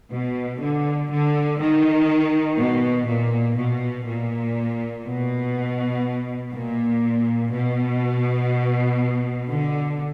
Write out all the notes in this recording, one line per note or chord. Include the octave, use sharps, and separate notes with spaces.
B2
D3
D3
D#3
B2
A#2
B2
A#2
B2
A#2
B2
D3